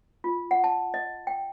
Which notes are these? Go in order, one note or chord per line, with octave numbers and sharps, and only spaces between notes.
F4
F#5
A5
D#5
G5